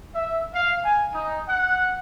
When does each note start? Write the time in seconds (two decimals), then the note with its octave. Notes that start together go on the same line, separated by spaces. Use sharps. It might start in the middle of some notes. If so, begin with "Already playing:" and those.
0.15 E5
0.54 F5
0.84 G#5
1.14 D#4
1.48 F#5